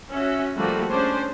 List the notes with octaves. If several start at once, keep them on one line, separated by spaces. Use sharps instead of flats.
C#4 F#4 E5
D3 F3 G3 A3 A#3 F#4
C#4 D4 G#4 C5